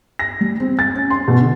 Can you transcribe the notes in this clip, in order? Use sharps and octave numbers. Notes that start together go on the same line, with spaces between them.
A#6
G3
C4
A6
C#4
C6
B2
D3